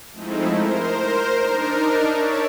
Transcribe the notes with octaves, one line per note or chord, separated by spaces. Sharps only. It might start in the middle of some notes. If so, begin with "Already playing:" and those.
F3 G#3 A3 C4 D#4 E4
A#4 C5
D4 D#4 A#4
C#5 D5 E5 A5